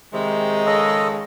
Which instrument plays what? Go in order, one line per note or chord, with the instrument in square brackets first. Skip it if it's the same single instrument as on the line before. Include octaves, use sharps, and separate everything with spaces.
[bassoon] C3 [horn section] D#3 G#3
[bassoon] C#3 [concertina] A4 D#5